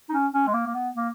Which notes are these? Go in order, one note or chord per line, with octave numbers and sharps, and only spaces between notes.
D#4
C#4
C#4
G#3
A#3
A#3
B3
A#3